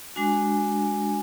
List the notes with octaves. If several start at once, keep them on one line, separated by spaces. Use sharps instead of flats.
G#3 D4 F#4 G#5